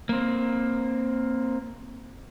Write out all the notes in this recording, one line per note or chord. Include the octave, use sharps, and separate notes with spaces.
A#3 C4